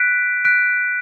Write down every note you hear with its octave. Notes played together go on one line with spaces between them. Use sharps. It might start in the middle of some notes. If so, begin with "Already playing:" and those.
Already playing: F#6 B6 D7
F#6 B6 D7